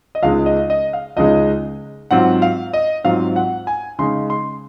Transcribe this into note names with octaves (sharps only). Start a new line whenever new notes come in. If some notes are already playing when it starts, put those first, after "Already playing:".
D#5
C#2 C#3 G#3 D#4 F5
D#5
D#5
F5
C#2 C#3 G#3 D#4 D#5
G#2 F#3 C4 F4 F#5
F5
D#5
G#2 F#3 C4 F4 F5
F#5
G#5
C#3 G#3 D#4 C6
C6